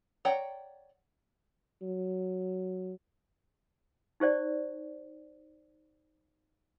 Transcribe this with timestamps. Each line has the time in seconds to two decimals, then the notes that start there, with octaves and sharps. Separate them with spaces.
0.25 C#5 D5 F#5 G5 A#5
1.82 F#3
4.20 D#4 G4 C5 D5